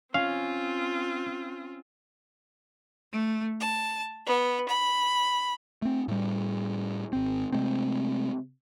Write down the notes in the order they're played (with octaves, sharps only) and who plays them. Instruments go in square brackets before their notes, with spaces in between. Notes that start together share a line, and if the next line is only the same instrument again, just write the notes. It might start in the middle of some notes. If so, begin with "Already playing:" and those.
[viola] C4 F4 [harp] C#4 [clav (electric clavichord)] F5
[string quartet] A3
A5
B3
B5
[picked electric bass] A3 C4
A2 G3
G#1 C4
C3 G#3 A3 C4